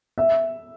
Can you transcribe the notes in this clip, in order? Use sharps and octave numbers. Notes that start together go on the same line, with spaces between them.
E5